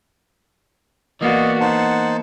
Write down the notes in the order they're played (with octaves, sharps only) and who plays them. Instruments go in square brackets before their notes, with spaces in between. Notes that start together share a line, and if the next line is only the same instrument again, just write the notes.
[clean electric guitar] E3 A#3 B3 [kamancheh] F#4 D5 [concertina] D#5
[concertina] D#4 C5 A5 [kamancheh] F#5